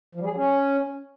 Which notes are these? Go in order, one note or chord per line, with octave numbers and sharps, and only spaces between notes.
F3
G3
G#4
F#3
C#4